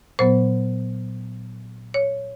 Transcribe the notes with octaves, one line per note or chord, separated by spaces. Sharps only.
A#2 F#3 B3 C5
C#5